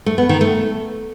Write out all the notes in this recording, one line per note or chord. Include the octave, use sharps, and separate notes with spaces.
A3
B3
D#3
A3